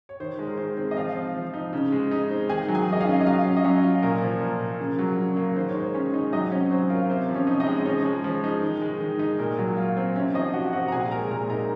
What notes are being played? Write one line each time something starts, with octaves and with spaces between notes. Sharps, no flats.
C#5
D#3 C5
G#3
A#4
D#3 C5
C4
D#5
F3 F4 F5
C4
F3
D#4
C#3
G#3
D#4
C4
D#3 G#4 G#5
F#3
G#4 G#5
D#3 D#5
F4 F5
C#4
D#5
F#3 F4 F5
C#4
D#5
F#3 C#4 C#5
F4
A#2 A#4
F3
A#2
A#3
C#3
F#3
C#3
A#3
D#3 C5
C#5
G#3
C5
D#3 C#4 C#5
D#4
F#3 D#4 D#5
C4 C#4 C#5
F#3 C5
F4 A#4
C3 C5
F3
C#4 C#5
D#4
D#4 D#5
G#3
F3 C#4 C#5
G#3
F3
D#4
D#3
G#3
D#3
D#4
A#2 A#4
F#3
F4
C4
C3 C#4 C#5
F3 D#4 D#5
C3 F#4 F#5
C4 F#4 F#5
A#5
A#2 G#4 G#5
G#3 A#4 A#5
A#2 A#4 A#5
D#4 A#4 A#5